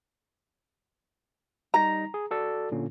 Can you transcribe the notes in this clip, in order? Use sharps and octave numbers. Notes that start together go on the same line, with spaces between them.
G3 D#4 A#5 A#6
G#4
F#4 A4 D5
A#2 D3 C#4